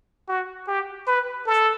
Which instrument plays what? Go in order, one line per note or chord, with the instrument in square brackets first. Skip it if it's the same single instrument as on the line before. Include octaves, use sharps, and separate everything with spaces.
[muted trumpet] F#4
G4
B4
A4